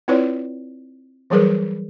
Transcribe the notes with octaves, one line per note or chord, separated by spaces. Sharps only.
C4 E4 F4 B4 C#5 D5
E3 F#3 G3 G#4 A#4 B4